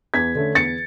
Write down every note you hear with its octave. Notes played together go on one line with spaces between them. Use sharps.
E2 G#6 B6
D3 A3 C#4
E2 A6 C#7